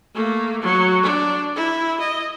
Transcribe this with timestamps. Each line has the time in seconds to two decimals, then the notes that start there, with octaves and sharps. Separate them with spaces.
0.15 A3 A#3
0.62 F#3
1.02 D4
1.56 E4
2.00 D#5